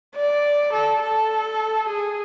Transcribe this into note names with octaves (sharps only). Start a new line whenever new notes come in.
D5
A4
A4
G#4